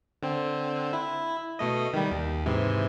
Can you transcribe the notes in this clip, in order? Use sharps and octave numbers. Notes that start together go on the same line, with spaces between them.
D3 C4
E4
B2 A3 D#5
D#3 G3
D#2
G#2 C3 E3